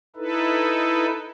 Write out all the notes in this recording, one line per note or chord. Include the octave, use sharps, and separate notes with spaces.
D#4 E4 A4 B4